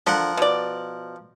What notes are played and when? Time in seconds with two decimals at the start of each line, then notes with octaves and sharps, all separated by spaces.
0.07 D3 F3 A#4 F#5
0.37 B2 D5